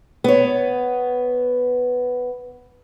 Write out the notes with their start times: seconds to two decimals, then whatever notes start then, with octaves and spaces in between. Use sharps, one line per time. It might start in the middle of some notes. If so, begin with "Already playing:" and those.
0.24 B3 C#5